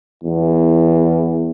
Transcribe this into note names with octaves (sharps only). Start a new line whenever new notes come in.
E2